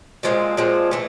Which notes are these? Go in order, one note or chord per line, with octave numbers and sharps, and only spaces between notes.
A#2 F3 G#3 C4
A#2 F3 G#3 C4
E3 A3